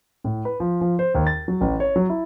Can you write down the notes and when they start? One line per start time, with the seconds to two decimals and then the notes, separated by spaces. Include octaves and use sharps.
0.24 A2
0.45 B4
0.60 F3
0.81 F3
0.99 C5
1.15 D#2
1.27 A6
1.48 F#3
1.61 A1
1.80 C#5
1.96 F#3
2.10 E4